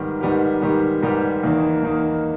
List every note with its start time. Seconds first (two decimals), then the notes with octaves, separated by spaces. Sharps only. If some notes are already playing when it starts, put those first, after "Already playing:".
Already playing: G#2 D#3 G3 B3 G4
0.21 G#2 D#3 G3 B3 G4
0.62 G#2 D#3 G3 B3 G4
1.02 G#2 D#3 G3 B3 G4
1.43 E2 D#3 A#3 D#4
1.83 E2 D#3 A#3 D#4